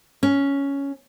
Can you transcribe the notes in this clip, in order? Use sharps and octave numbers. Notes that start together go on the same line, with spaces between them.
C#4